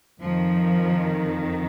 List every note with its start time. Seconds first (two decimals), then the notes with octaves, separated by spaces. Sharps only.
0.20 F2 D#3 F3